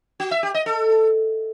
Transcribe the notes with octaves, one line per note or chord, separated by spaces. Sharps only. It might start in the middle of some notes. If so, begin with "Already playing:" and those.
F#4
E5
G4
D#5
A4